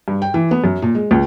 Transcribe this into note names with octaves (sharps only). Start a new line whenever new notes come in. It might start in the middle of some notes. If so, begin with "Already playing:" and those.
G2
G5
E3
B3
F#2
A#2
G#3
C#2